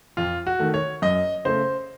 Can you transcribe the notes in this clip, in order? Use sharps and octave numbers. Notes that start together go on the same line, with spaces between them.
F2 F4
F#4
D#3 A3
C#5
F#2 D#5
C#3 A3 C5